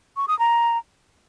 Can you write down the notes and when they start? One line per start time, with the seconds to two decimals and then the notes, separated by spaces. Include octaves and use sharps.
0.17 C#6
0.28 D#6
0.39 A#5